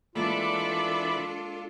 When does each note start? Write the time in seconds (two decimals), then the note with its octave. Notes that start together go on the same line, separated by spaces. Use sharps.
0.15 E3 G#3 A#3 D4 F4 A4 D5 B5